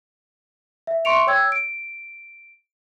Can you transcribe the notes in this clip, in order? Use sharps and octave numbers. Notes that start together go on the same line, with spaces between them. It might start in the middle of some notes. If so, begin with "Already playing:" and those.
E5
E5 C6 C#6 C#7 D7 F7
C#5 G5 E6 G#6
D7